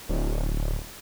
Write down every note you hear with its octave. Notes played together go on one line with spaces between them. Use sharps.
D1